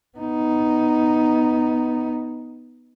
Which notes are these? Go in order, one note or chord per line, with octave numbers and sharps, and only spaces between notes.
B3 D#4